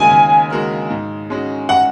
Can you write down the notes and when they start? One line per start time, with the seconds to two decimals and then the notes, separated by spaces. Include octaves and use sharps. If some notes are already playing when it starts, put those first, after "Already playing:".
Already playing: D#2 C#3 G#3 F#4 A#4 G#5
0.11 D#2
0.51 C#3 G#3 F#4 A#4
0.90 G#2
1.30 G#3 C#4 F#4
1.69 F#5